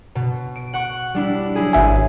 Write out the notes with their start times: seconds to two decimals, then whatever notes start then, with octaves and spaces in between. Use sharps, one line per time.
0.15 B2
0.56 D7
0.73 F#5 C#6
1.14 G3 D4 E4
1.55 F#3 E4 G#4
1.73 G#1 E5 G#5